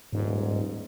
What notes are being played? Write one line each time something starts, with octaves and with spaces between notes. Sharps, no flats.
D#1 G#2